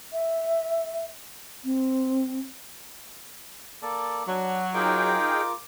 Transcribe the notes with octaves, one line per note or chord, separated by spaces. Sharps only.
E5
C4
A#3 A4 D5
F#3 D4
D#4 F4 G#4 A#4 G5 D6